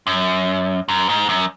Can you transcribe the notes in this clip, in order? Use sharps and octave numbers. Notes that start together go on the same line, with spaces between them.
F#2
F#2
G#2
F#2